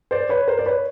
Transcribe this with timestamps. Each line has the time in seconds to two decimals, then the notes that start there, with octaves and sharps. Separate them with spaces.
0.11 C5 D5
0.29 B4 C#5
0.47 A#4 C5
0.59 D5
0.66 B4 C#5